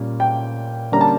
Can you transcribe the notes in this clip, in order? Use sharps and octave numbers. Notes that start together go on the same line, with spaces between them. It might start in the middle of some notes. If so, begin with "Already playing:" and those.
Already playing: A#2 G3 C#4
G5
D3 G3 A#3 C#4 A#5
A5